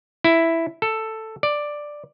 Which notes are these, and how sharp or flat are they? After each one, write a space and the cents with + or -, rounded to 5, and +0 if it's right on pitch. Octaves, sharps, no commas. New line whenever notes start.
E4 +0
A4 +5
D5 +5